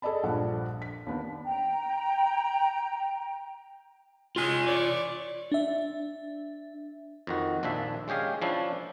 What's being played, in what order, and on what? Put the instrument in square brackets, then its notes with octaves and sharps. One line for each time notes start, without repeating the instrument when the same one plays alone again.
[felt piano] G#4 A4 D5 D#5 A5 B5
A#1 G2 F3 D4 F#5
B6
D#2 B3 D4
[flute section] G5 A#5
[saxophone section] G#3 C#4 [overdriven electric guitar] F4 G#5
[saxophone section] E3 C#5 D5
[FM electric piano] D4 E5
[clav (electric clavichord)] F2 D#3 F#4
A#1 D#2 F3 D4 D5 E5
G#3 C#4 G4 G#4 F5
F3 C#4 D4 E4